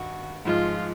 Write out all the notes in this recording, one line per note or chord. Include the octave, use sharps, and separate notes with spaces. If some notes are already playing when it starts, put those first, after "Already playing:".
Already playing: G2 D#3 F#4
G#2 F3 G#3 F4